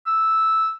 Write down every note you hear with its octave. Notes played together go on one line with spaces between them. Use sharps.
E6